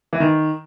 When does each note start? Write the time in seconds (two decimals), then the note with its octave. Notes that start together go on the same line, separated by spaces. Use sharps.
0.13 E3
0.20 D#3